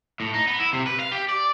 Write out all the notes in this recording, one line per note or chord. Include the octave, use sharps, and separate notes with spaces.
A2
D#4
B3
E4
C3
B4
F5
G4
D5